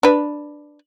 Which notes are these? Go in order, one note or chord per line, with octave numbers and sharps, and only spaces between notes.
D4 B4